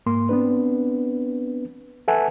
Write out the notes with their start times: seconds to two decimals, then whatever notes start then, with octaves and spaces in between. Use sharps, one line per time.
0.06 G#2 A#3 C6
0.29 B3 C4 D4 B4
2.08 A4 B4 E5 F#5 G#5 A5